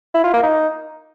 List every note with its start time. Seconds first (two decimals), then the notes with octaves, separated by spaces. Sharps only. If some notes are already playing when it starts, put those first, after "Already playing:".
0.14 E4
0.24 F4
0.34 A#3
0.43 D#4